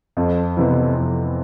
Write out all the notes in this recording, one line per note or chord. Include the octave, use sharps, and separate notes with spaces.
F2
C3 E3 B3 E4
F2